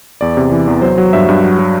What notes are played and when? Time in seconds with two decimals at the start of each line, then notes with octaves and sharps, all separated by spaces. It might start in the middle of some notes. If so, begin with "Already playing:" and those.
0.21 E2 D5
0.37 C3
0.52 E3
0.68 E2
0.82 F#3 C5
0.98 F#3
1.13 G2 E5
1.29 G2
1.44 F#3
1.59 F#3